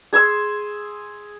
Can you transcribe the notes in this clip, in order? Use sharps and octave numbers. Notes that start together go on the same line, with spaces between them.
G#4 G#5 C6 E6